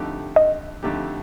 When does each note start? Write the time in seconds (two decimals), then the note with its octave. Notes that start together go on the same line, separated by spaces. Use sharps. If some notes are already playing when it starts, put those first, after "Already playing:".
Already playing: F2 D3 A3 D#4 G4
0.36 D#5
0.83 F2 D3 A3 D#4 G4